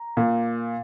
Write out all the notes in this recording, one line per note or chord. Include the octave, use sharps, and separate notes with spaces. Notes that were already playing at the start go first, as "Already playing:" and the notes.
Already playing: A#5
A#2